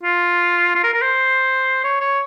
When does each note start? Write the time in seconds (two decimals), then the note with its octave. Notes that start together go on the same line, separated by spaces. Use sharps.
0.03 F4
0.75 F4
0.84 A#4
0.94 A#4
1.02 C5
1.84 C#5
2.01 C#5